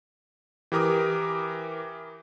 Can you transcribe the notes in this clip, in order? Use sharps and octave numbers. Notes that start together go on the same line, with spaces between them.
E3 G4 A#4 D6 D#6